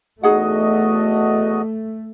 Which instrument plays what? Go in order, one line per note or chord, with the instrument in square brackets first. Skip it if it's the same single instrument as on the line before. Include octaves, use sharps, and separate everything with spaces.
[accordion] E2 F#4 D#5 [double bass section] A3 [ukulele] D#4 G#4 F#5